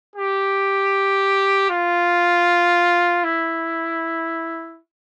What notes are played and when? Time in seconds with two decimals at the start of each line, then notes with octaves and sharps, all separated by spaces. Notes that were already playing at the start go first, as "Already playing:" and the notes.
0.16 G4
1.70 F4
3.24 E4